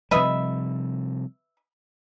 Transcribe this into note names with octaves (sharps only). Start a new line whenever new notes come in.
C3 F3 G3 B4 D#5 E5